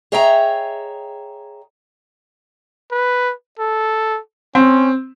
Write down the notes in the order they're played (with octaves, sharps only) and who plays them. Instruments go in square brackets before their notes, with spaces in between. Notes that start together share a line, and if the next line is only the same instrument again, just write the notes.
[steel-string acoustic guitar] G#4 C#5 D#5 E5 G5 A#5
[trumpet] B4
A4
[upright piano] C4 [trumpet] C#4